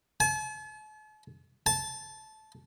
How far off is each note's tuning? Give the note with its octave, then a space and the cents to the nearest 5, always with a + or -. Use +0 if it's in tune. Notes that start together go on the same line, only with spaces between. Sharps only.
A5 -45
A5 -15